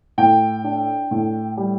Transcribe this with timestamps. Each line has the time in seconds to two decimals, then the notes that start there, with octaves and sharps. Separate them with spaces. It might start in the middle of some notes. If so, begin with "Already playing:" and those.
0.18 A2 G5
0.64 D4
1.11 A2
1.57 G3